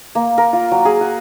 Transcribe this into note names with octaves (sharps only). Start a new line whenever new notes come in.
A#3
A#4
F4
F#3
G#4
F#4